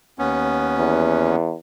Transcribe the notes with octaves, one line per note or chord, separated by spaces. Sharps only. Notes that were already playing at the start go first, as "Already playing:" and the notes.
D#2 B3 C#4
E2